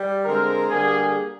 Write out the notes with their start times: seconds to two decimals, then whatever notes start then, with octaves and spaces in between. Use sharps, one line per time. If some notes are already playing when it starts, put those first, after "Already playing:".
Already playing: G3
0.25 D3 G#3 C4 A#4
0.70 D3 G3 A#3 G#4